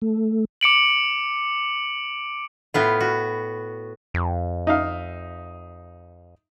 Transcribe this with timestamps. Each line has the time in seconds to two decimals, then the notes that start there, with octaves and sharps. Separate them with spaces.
0.02 A3
0.61 D6 C#7 D7 F#7
2.74 A2 B3 F4
3.00 F#4
4.14 F2
4.67 D#4 E5 F5